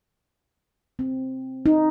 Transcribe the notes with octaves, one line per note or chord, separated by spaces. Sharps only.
C4
D#4